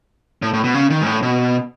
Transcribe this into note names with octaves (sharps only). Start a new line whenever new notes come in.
A2
A2
B2
C#3
D#3
G#2
A2
B2